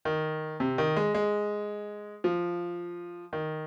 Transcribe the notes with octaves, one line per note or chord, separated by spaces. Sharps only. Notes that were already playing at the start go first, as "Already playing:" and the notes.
D#3
C3
D#3
G#3
G#3
F3
D#3